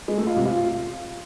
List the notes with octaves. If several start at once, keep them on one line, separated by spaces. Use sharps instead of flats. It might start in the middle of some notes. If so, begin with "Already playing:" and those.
G#3
A3
F4
C3
F4